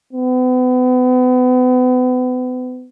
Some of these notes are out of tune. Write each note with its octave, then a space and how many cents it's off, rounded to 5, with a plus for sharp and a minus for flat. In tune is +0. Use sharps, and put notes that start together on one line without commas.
B3 +35